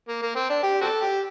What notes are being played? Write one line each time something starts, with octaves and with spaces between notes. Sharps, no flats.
A#3
A#3
C4
D4
G4
C4 F#4 A4
G4